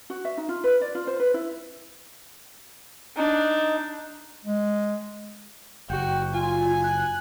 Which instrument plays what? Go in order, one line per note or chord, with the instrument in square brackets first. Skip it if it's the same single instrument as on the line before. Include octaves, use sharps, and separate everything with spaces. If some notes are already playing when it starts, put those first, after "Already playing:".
[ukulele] F#4
E5
D#4
F4
B4
D5
F4
C5
B4
E4
[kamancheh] D4 [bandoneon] D#4
[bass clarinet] G#3
[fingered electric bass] F#1 [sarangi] F#4 [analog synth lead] G5
[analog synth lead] F4 [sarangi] G#5
[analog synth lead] F#6